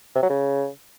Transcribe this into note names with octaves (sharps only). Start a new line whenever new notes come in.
C3
F#3
C#3